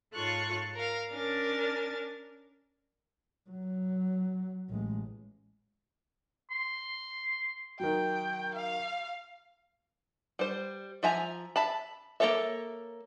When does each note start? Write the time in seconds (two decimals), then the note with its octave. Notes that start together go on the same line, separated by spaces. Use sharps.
0.14 G#2 F4 A4 C#5 C#6 F#6
0.74 A#4 F5
1.11 C#4 D4 A#4 G#5 A6
3.50 F#3
4.70 A1 G#3
6.51 C6
7.80 D#3 F#3 G5
8.55 F5
10.39 G3 C5
11.03 F3 E5 G#5 A#5
11.56 E5 A5 B5
12.20 A#3 F#4 A4 C#5 E5